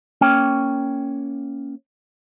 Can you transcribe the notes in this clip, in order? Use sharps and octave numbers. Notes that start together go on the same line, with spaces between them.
A#3 C#4 G5